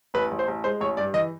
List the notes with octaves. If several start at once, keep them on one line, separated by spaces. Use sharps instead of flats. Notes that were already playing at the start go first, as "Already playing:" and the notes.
A1 B4
A1
C5
A1
G#3 C5
A1 C#5
G2 D5
E3 D#5